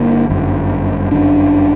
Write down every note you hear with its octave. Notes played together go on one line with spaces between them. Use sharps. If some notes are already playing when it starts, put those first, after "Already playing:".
Already playing: G1 D3 A#3
G1 F#2 D3
G1 F#2 D3 D4